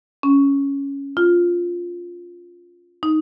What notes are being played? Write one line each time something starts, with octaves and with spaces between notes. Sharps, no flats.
C#4
F4
D#4